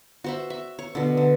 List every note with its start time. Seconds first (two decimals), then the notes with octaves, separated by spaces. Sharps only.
0.24 F#4 C5 E5
0.50 E5
0.79 C#5
0.95 B2 D3
1.17 D3